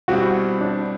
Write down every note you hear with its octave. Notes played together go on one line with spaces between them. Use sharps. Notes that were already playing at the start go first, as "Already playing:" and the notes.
B2 G3 C4 E4 F#4 G4
D4